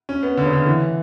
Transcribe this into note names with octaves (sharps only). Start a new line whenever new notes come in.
C#4
B3
D3
C#3
D3
E3